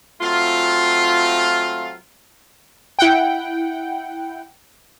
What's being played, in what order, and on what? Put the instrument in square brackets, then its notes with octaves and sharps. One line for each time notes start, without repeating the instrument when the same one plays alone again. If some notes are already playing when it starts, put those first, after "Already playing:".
[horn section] F#3 A3 C4 F4
[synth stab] E4 F#5 G5